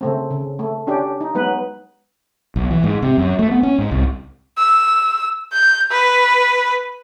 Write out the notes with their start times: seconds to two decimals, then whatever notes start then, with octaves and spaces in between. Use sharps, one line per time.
0.01 C#3 A3 C4
0.31 C#3
0.59 A3
0.87 C#4 D4 G4
1.21 D#4
1.35 F#3 G#3 B3 D#4 B4
2.56 B1
2.71 E3
2.84 G#2
3.02 C3
3.17 F#2
3.39 A3
3.51 B3
3.63 C#4
3.78 G#2
3.91 C2
4.58 E6
5.53 G6
5.91 B4